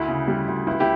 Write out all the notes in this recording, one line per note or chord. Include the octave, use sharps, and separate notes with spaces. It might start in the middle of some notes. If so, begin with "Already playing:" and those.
Already playing: D2 E4
C#3
G3
D2
C#2 E4
E4 G4